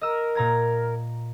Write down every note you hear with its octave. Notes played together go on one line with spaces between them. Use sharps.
A#4 D#5 E6
A#2 A#5 G#6